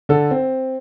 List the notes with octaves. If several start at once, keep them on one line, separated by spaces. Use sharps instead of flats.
D3 A4
C4